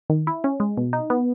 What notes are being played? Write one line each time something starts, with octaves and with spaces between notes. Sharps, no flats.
D#3
E4
C#4
G#3
B2
D#4
B3